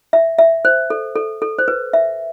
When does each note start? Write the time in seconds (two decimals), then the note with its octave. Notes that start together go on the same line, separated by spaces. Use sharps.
0.13 E5
0.39 E5
0.65 C5
0.90 A4
1.16 A4
1.42 A4
1.59 C5
1.68 B4
1.93 E5